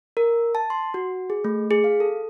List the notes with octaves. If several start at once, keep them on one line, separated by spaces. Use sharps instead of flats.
A#4
A5
C6
F#4
G#4
A3
G#4
F5
A4